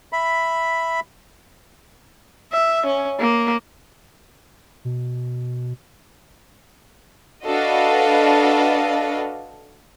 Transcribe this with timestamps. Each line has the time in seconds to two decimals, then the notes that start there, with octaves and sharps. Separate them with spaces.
0.13 E5 B5
2.53 E5
2.86 C#4
3.20 A#3
4.85 B2
7.46 D4 F#4 A4 B4 D#5 F5